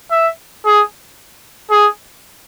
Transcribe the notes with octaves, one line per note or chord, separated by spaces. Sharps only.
E5
G#4
G#4